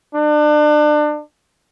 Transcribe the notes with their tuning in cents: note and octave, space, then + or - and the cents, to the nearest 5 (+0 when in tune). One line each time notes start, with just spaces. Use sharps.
D4 +30